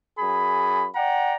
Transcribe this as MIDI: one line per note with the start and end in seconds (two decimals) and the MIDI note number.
0.19 0.88 42
0.19 0.88 68
0.19 0.88 83
0.95 1.36 74
0.95 1.36 78
0.95 1.36 79
0.95 1.36 82